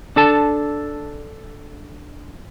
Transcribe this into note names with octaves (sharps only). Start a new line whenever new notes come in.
D4 A4 A5